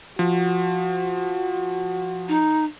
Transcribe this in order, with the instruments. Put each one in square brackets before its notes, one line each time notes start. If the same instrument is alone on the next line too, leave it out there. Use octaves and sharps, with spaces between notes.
[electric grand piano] F3 [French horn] F#4
[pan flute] D#4